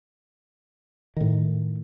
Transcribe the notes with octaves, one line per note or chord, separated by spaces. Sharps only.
A2 D#3